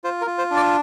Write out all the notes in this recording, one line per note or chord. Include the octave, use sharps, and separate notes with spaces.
F4 C5
A#4
F4
C5
D4
D5